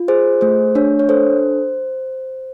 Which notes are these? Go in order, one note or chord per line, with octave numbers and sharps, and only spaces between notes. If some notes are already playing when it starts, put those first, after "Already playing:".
Already playing: F4
G#4 C5
A3 C5
D4 C#5
C#5
A4 C5